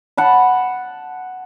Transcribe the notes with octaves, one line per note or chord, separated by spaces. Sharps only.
F#5 A5 B5